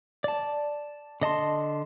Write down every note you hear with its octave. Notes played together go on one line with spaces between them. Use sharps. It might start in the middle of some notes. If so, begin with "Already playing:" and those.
D5 A5
D3 D#5 A5 C6